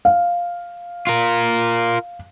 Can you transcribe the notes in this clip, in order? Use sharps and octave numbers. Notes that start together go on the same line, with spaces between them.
F5
F4 A#4